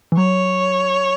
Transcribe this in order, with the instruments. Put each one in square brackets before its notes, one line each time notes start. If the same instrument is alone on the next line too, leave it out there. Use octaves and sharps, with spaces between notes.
[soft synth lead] E3
[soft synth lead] F#3 [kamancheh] C#5